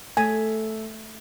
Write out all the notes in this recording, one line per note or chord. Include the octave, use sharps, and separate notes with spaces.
A3 G#5